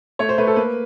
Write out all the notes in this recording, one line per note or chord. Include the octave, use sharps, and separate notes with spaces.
A3 C#5
C5
A3 B4
A4
A#3 B4